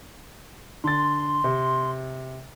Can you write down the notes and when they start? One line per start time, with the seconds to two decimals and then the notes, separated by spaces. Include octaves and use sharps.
0.84 D3 C6 A6
1.44 C3